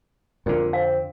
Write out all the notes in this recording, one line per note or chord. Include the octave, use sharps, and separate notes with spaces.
F2 A#2 D3
C4 F5